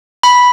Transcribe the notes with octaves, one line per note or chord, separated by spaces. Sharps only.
B5